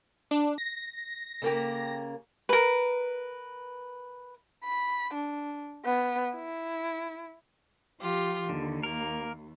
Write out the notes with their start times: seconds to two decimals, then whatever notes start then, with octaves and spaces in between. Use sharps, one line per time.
0.31 D4
0.58 A#6
1.42 C#3 A#3 G4
2.49 A#4 B4
4.64 B5
5.14 D4
5.85 B3
6.35 E4
8.01 F3 F4 G4
8.49 D#2 D3
8.83 A#3 A#4